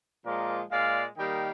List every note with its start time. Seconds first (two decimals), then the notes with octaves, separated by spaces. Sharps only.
0.25 A#2 F3 G#3 A#4 D5
0.71 A#2 G#3 D5 F5
1.17 D#3 G3 A#3 D#5 G5